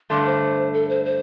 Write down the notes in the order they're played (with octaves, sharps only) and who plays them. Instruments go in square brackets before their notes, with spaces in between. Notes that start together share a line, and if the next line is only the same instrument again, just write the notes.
[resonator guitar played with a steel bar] G2 D3 A3 [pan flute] C6
[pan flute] C5
A4
C5
C5